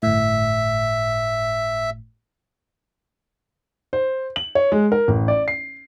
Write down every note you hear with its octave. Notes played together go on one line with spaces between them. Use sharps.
G1 A2 E5
C5
F#7
C#5
G#3
A#4
A1
D5
C7